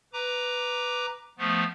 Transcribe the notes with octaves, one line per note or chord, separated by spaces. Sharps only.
B4 A#5 D6
F3 A3 B3